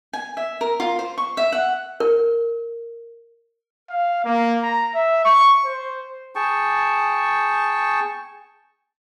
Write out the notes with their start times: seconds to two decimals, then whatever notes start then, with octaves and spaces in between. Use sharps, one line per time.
0.13 G#5
0.37 E5
0.61 A#4
0.80 F4
0.99 C5
1.18 C#6
1.37 E5
1.52 F#5
2.00 A#4
3.90 F5
4.25 A#3
4.63 A#5
4.95 E5
5.25 C#6
5.65 C5
6.35 G#4 G5 A5 C#6